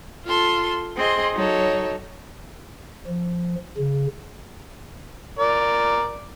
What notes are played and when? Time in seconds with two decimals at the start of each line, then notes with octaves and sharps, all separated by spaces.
0.24 F4 A4 C6
0.96 C4 G#4 D#5 C6
1.34 F#3 D#4 A4 C#5
3.07 F3
3.78 C#3
5.39 A#4 D5